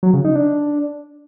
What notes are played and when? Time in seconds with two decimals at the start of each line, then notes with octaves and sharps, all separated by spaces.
0.03 F#3
0.14 C#3
0.24 D#4
0.35 D4